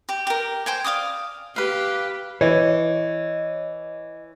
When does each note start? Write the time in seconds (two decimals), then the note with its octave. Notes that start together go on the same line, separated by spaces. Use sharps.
0.09 G4
0.27 G4 A#4
0.66 C5 G5 G#5
0.84 D5 F5 D6 D#6
1.56 G4 B4 F5
2.41 E3 C#5 D#5